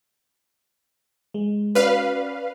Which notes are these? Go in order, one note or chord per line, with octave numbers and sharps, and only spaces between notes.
G#3
C#4 F#4 B4 D5 F5